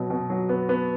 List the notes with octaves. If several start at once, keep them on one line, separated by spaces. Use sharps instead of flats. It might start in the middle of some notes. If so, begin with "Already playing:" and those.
Already playing: B2 F#3
B2
F#3
B3
B3